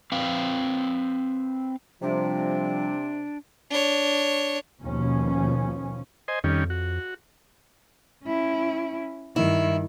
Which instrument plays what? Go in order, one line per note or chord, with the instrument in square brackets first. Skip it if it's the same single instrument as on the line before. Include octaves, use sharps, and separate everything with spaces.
[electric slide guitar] C4 B4 F5
[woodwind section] C3 [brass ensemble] F3 G3 [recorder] D4
[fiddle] D4 C#5
[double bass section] D#2 B2 F3 C#4
[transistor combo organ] C5 D#5 G#5
[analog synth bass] F2 [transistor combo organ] D#3 G3 C#4
[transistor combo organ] F#4
[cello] C#4 E4
[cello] G2 D#3 [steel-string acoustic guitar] E4